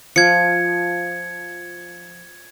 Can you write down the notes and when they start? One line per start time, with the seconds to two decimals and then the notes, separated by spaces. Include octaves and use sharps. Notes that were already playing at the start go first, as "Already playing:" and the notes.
0.16 F3 G#6 C#7